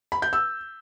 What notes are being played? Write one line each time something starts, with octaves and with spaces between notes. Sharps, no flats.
B5
G6
E6